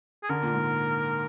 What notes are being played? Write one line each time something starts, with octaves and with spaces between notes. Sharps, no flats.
G#4
D3 A#4
A#2
G#2